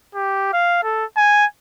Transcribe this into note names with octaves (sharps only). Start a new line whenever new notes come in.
G4
F5
A4
G#5